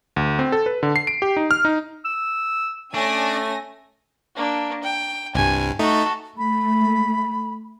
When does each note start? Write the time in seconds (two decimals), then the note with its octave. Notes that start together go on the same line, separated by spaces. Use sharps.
0.16 D2
0.39 C4
0.52 A4
0.66 B4
0.83 D3
0.96 C7
1.07 D7
1.22 G4
1.37 D#4
1.51 F6
1.65 D#4
2.05 E6
2.94 A3 C#4 D4 G#5 A#6
4.36 A#3 D4
4.83 G5
5.35 C2 G2 G#5
5.79 A3 D#4 F#4 A4
6.38 A3 B5